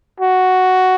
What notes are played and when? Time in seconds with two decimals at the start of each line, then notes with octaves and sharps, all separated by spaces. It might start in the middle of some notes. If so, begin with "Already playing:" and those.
0.20 F#4